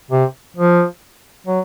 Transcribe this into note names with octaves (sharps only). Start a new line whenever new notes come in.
C3
F3
F#3